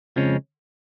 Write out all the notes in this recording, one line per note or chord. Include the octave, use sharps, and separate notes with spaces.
F2 C#3 F3 G#3 C#4